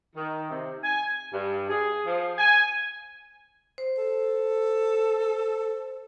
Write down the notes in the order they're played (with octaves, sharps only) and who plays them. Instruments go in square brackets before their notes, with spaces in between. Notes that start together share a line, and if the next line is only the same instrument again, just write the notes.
[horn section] D#3
C3
G#5
G2
G#4
F3
G#5
[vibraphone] C5
[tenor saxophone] A4